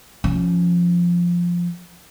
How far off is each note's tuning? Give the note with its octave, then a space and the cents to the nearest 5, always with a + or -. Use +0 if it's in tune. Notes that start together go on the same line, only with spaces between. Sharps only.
F3 +0 C#4 +0